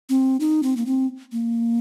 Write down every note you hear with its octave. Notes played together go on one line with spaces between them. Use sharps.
C4
D#4
C4
A#3
C4
A#3